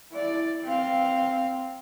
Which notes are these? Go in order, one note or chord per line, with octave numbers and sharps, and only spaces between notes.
E4 D5
C4 F5